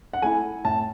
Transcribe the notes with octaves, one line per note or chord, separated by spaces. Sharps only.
F#5
A3 E4 G#5
A2 A5